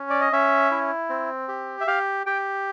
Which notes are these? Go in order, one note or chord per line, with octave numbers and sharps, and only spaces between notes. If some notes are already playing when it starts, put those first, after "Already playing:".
Already playing: C#4
D5
D#5
C#4 E5
E4
C4
G4
E5
G4 F5
G4 G5